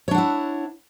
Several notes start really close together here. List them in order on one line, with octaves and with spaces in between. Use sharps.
C#5 D4 F#5 E4